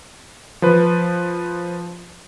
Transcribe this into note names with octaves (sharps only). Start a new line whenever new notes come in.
F3 B4